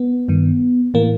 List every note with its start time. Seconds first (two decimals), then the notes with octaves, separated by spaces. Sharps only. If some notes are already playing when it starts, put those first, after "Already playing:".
Already playing: B3
0.28 G2 D#3
0.94 A2 E3 A#3